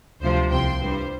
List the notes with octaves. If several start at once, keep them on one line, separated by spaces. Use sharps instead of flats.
D2 C3 F3 C5
C2 C3 F3 G5 C6
G2 G3 C5